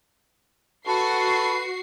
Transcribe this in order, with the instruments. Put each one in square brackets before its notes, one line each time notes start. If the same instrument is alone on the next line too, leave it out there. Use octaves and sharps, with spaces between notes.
[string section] F#4 C7 [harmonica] A4 B4